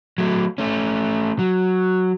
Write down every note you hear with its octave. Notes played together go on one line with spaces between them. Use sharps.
F#3 A3
A3 C#4
F#3